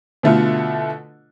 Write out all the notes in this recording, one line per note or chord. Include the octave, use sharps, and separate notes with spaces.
B2 D3 A3 E4 F4